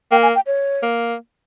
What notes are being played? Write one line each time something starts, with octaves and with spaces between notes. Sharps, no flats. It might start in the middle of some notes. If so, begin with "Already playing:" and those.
A#3 G5
G#5
G5
C#5
A#3